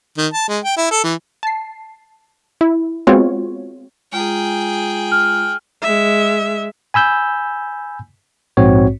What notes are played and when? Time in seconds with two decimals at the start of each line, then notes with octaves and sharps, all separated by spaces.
0.18 D#3
0.33 A5
0.48 G#3
0.64 G5
0.77 E4
0.91 A4
1.04 E3
1.43 A5 C7
2.61 E4
3.07 G#3 B3 C4 F4 F#4 C#5
4.12 G#3 F4 G#4 G5 A#5
5.12 F6
5.82 G#3 E5
6.94 G#5 B5 E6 G6
8.57 A#1 G#2 C4 F#4 C#5